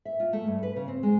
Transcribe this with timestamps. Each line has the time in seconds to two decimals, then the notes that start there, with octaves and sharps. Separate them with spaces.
0.05 E5
0.20 F4
0.33 A3
0.47 G2
0.63 B4
0.76 C#3
0.88 C4
1.03 G#3